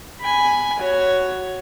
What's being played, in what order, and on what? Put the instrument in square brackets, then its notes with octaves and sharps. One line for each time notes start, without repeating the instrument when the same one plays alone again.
[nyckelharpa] G#5 B5
F#4 C#5